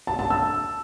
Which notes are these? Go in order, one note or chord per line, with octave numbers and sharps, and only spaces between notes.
A5
A5
E6